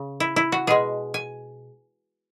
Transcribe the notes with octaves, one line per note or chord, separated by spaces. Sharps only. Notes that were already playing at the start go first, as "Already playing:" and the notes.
Already playing: C#3
E4
E4
F#4
B2 G#3 G#4
G#5